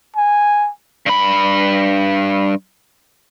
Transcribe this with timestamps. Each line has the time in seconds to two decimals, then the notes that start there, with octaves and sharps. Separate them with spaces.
0.16 G#5
1.06 G2 B5